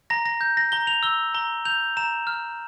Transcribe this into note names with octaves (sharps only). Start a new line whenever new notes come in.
A#5 A#6
A#6
G6
A#6
A#5 G7
F7
E6 G7
A#5 G7
G6 F7
A#5 E7
F6